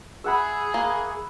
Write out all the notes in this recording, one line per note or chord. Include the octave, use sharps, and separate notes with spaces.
G#4 E5 F#5 B5
A#3